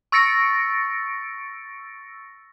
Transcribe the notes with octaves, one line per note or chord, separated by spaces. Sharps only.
C#6 E6 A6 A#6 C#7 D7